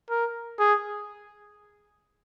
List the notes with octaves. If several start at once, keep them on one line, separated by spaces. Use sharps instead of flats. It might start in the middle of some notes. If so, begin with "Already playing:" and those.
A#4
G#4